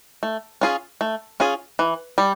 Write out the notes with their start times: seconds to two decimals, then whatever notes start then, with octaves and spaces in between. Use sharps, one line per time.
0.23 A3
0.61 C#4 F4 G#4
1.01 A3
1.40 C#4 F4 G#4
1.79 E3
2.18 G3